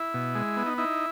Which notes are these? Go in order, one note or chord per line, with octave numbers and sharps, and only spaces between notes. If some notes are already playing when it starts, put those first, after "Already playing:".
Already playing: E4
B2
G#3
B3
D#4
D#4 E4